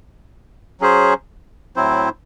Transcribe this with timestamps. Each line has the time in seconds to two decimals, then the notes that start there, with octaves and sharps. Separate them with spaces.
0.81 F#3 C#4 G#4 C5
1.76 A2 F#3 C4 E4 C5